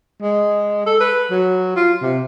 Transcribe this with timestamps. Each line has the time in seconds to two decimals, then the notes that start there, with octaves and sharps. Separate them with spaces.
0.22 G#3
0.86 A4
1.00 B4
1.31 F#3
1.76 F4
2.02 C3